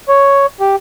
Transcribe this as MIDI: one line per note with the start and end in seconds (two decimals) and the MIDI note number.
0.08 0.46 73
0.60 0.76 67